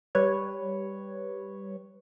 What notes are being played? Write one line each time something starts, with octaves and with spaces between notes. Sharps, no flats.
G3 B4 C#5